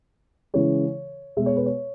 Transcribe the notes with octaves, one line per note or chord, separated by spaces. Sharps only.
C#3 E3 G#3 C#5
B2 G#3 E5
C#5
B4
C#5